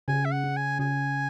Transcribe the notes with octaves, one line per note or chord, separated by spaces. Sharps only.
C#3 G#5
E5
F#5
C#4
G#5
C#3 G#5